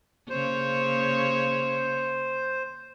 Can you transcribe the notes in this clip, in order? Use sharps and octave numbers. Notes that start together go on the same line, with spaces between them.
C#3 A#3 C5 C#5